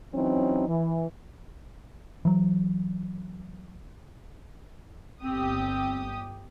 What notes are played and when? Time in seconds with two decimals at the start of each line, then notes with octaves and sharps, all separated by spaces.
0.15 E3 F#3 C4 C#4 D#4
0.68 E3
2.25 E3 F#3
5.23 G1 C4 G4 D#6